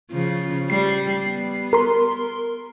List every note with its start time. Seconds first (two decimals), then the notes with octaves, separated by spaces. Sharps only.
0.11 C#3 F3
0.70 G3 C7
1.25 B3
1.73 A#4 C6